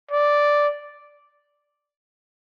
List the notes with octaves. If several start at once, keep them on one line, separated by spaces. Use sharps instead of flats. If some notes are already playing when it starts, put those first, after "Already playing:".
D5